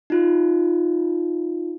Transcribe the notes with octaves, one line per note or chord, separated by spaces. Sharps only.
D#4 F4